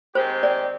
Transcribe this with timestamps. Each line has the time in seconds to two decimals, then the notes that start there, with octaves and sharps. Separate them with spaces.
0.15 D#3 G#3 C4 G4 C5
0.43 D5